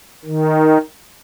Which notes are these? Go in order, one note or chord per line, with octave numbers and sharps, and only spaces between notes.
D#3